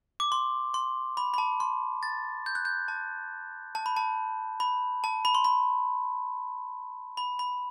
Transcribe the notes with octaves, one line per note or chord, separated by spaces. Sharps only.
D6
C6
C6
B5
B5
A5
C6
A6
G6
F#6
G6
A5
A5
B5
A5
B5
A5
B5
C6
B5
B5
B5